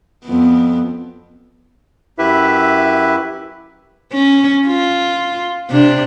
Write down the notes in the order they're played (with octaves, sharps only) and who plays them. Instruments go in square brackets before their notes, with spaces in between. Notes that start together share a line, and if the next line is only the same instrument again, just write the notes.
[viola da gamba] F2 B3
[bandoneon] F#2 E4 G4 B4 E5
[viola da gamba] C#4
F4
C3 D4